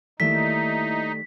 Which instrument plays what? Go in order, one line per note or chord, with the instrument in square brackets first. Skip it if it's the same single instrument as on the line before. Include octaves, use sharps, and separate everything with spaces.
[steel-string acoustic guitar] D#3 G3 A3 [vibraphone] A#3 E4 E5 [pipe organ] D#4 [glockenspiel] B6